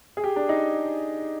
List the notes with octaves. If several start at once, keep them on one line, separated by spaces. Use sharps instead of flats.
G#4
G4
D4
D#4